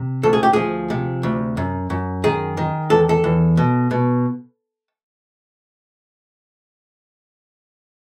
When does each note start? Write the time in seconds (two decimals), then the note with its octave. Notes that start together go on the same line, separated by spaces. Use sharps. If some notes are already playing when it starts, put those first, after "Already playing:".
Already playing: C3
0.23 D2 A4
0.33 G#4
0.43 G4
0.53 F3 G#4
0.90 C3
1.23 D2
1.57 F#2
1.90 F#2
2.24 D#3 G#4
2.57 D#3
2.90 E2 A4
3.09 A4
3.24 E2
3.57 B2
3.91 B2